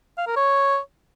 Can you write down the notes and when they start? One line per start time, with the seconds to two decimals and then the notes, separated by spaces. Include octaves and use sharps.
0.18 F5
0.27 A#4
0.36 C#5